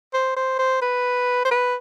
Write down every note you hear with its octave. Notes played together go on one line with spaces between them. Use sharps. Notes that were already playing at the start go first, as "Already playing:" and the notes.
C5
C5
C5
B4
C5
B4